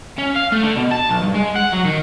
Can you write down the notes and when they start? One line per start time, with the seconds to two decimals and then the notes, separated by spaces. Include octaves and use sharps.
0.18 C#4
0.36 F5
0.52 A3
0.64 D3
0.77 B2
0.92 A5
1.10 B1
1.22 G2
1.34 G#3
1.56 F#5
1.73 F#3
1.86 D#3